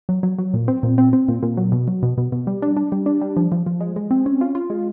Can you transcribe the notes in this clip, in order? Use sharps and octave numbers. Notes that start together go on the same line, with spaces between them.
F#3
F#3
F#3
A#2
C4
A#2
C4
C4
A#2
A#2
F#3
B2
F#3
B2
B2
B2
G3
D4
D4
G3
D4
G3
F3
F3
F3
G#3
G#3
C4
C#4
F4
F4
G#3